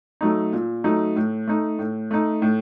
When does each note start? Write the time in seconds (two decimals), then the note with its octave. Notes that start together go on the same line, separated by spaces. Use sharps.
0.21 F#3 A3 D#4
0.53 A#2
0.84 F#3 A3 D#4
1.16 A2
1.48 A3 D#4
1.79 A2
2.11 A3 D#4
2.42 A2